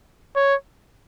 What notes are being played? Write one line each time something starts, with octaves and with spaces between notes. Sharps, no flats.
C#5